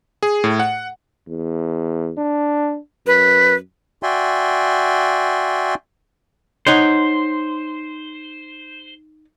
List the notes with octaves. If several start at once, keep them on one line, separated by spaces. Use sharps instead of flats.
G#4
A2
F#5
E2
D4
F#2 B4
F#4 D5 E5 G5 G#5 C6
D#4 C5 C#5 F#5